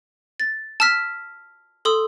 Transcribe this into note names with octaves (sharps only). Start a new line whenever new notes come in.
A6
A5 E6 F6 B6
A4 C6 D#6 E6